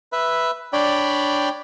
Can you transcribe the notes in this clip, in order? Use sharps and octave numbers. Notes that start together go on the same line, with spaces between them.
B4 E5
D4 C#5 D5 G5 B5